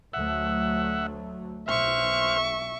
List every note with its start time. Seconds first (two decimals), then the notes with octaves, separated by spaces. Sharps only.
0.13 D2 F#3 A3 E5 F#5
1.68 B1 C5 E5 C#6 F6